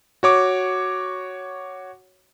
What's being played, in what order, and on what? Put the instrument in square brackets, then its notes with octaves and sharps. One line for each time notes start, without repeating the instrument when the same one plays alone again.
[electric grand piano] F#4 C#5 D6